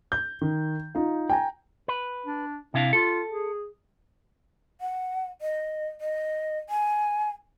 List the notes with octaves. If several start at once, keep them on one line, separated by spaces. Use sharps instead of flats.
G6
D#3
D#4 F4
G5 G#5 A#5
B4
D4
C3 D4 E4 F5
F4 A4
G#4
F#5
D#5
D#5
G#5